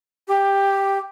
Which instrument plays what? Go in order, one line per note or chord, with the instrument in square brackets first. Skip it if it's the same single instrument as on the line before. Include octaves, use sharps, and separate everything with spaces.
[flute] G4